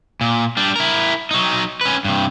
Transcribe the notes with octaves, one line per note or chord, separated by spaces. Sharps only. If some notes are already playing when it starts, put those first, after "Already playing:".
A#2
G3 D4
E4 A#4
F#3 D#4
C#4 B4
G2 C3